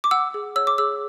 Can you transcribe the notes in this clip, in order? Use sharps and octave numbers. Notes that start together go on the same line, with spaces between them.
D6
F#5 E6
G#4
C#5 E6
D6
G#4 E6